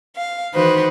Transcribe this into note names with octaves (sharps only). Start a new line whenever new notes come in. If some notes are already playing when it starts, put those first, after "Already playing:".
F5
D#3 E3 D#4 F#4 B4 C5